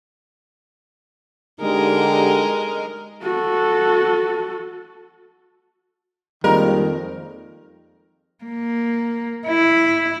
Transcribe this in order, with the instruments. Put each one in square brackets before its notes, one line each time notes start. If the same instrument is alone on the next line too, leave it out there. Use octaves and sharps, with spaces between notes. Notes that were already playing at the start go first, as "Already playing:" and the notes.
[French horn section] D3 D#4 G4 [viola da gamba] G#3 A#4 D#5
[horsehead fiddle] F#4 A4
[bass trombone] F2 [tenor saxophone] D#3 [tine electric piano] G3 G#3 A#3 [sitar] A#4
[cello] A#3
E4